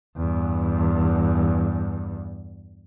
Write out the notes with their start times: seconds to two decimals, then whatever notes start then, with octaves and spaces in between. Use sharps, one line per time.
0.17 E2 G2